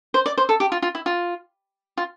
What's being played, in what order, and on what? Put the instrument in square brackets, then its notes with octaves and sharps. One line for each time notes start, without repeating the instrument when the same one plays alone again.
[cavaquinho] C5
D5
C5
A4
G4
F4
F4
E4
F4
F4